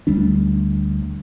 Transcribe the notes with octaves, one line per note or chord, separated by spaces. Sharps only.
D2 G3 A3 D4